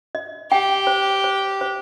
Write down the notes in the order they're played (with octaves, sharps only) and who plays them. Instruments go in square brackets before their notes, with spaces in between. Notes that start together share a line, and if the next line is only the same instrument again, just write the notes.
[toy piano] D#5
[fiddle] G4 [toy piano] G5
[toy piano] C5
C5
C5